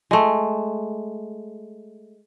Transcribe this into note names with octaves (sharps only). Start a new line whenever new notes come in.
G#3 A3